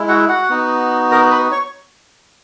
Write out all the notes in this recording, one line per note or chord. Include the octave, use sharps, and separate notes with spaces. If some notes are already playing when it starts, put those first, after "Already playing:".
Already playing: G#3 E4
F#4 F#5
F#4 F#5
B3 D#4 F#4
A#4 A#5
B4 B5
C#5 C#6